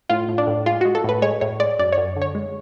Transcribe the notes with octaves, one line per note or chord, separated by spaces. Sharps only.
A2 F4
A2
D4
A2
G#3 F4
G#3 F#4
A4
A2 B4
G#3 C#5
A2 C#5
G#3 D5
F#2 D5
C#5
F#2
D3
C#5
G#3